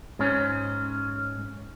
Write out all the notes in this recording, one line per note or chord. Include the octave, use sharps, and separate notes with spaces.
G#2 C#4